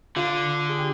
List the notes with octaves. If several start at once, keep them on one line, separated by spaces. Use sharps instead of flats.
D3 F4
G#4
G4